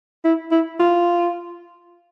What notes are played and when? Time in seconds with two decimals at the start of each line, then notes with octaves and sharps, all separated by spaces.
0.25 E4
0.51 E4
0.80 F4